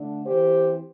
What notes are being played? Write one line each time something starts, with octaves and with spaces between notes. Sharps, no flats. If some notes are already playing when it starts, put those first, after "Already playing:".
Already playing: D3 A3 D4
E3 C4 G4 C5